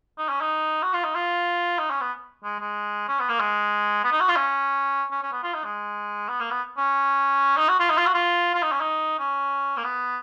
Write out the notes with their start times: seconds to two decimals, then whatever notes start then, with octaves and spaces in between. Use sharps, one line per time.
0.18 D#4
0.29 C#4
0.41 D#4
0.83 F#4
0.93 F4
1.04 D#4
1.15 F4
1.79 D#4
1.90 C#4
2.01 B3
2.44 G#3
2.60 G#3
3.08 C#4
3.19 B3
3.29 A#3
3.40 G#3
4.04 B3
4.12 D#4
4.20 F#4
4.28 F4
4.36 C#4
5.11 C#4
5.23 C#4
5.33 B3
5.44 F4
5.54 D#4
5.65 G#3
6.29 B3
6.40 A#3
6.51 B3
6.77 C#4
7.57 D#4
7.69 F#4
7.80 F4
7.90 D#4
7.98 F4
8.06 F#4
8.14 F4
8.55 F4
8.63 D#4
8.72 C#4
8.80 D#4
9.19 C#4
9.77 A#3
9.84 B3